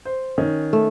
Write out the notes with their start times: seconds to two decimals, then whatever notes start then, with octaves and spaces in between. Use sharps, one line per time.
0.05 C5
0.38 D#3 C#4
0.73 A3